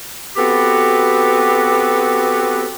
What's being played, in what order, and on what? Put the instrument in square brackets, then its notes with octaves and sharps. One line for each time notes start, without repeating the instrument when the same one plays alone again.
[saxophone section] B3 C4 F#4 G4 A4 B4